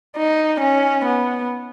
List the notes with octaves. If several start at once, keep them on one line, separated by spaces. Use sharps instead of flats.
D#4
C#4
B3